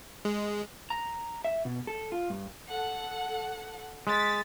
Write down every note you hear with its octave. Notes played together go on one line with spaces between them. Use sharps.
G#3
A#5
E5
B2
A4
F4
G2
A4 F#5
G#3 A6 B6